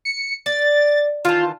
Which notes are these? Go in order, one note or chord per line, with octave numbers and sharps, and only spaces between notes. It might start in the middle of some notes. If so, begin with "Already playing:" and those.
C#7
D5 A6
D#3 E3 F4 A5